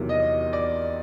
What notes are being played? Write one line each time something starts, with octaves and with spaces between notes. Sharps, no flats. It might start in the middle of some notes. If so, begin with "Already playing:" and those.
Already playing: E2 C3 D#3 F#3 A#3
D#5
D5